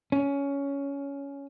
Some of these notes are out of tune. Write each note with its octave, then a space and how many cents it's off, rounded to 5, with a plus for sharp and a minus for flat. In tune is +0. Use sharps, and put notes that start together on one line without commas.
C#4 +15